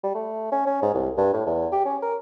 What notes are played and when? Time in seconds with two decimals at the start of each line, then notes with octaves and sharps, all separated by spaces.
0.04 G3
0.15 A3
0.52 C#4
0.66 C#4
0.82 G#2
0.94 C2
1.17 G2
1.34 A2
1.46 E2
1.72 G4
1.85 C#4
2.02 A#4